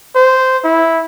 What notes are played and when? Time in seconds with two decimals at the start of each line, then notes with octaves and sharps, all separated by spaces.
0.15 C5
0.64 E4